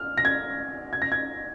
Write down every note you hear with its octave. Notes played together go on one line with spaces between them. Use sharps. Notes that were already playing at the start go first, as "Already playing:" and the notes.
Already playing: F6
A#6
G#6
G#6
A#6
G#6